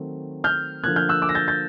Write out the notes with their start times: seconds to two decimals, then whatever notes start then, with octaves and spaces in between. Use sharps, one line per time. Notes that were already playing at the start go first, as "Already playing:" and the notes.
Already playing: D#3 F#3 A3 C4
0.44 F6 G6
0.83 D3 F3 A#3 F#6 G#6
0.96 F6 G6
1.09 E6 F#6
1.22 D6 E6
1.29 A#6
1.35 G6 A6
1.48 G6 A6